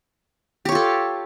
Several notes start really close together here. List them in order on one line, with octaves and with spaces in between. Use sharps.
G4 C#5 F4 A4